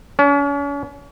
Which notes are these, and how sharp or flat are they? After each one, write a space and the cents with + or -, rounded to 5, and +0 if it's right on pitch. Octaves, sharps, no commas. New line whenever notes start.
C#4 +40